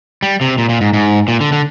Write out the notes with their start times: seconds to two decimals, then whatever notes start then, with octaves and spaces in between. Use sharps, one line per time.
0.23 G3
0.41 C3
0.58 A#2
0.69 A#2
0.81 G#2
0.94 G#2
1.28 A#2
1.41 D3
1.52 D3